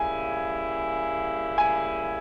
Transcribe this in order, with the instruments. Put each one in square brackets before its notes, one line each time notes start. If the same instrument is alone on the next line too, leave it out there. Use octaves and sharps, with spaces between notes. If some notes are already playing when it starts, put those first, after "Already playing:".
Already playing: [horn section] C#3 G3 A#3 E4 [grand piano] G#5
[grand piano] G#5